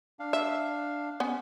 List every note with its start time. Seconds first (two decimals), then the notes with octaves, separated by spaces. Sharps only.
0.19 D4 F5
0.33 E5
1.20 B3 C#4